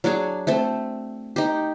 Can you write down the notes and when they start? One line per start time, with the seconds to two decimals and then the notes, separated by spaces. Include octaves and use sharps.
0.04 F#3 D4 F#4 G#4
0.47 A3 C4 A4
1.36 D#4 G4